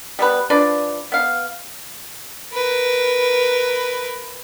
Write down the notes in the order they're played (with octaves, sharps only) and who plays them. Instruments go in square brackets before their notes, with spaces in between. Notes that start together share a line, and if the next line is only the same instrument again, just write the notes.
[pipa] G3 B3 B4
F3 D4 B4 D5
B3 F5
[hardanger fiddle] A#4 B4